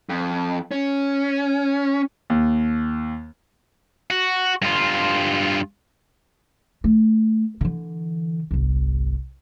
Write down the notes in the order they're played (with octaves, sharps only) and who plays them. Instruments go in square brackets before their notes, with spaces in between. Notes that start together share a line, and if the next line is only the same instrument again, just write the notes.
[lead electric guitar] F2
C#4
[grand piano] D#2
[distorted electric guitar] F#4
G2 F4
[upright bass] A3
D3 E3
G1 C2